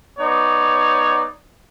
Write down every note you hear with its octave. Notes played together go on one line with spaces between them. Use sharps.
B3 D#4 C#5 D5